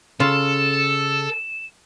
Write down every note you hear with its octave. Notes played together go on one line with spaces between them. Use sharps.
C#3 F4 A4 E7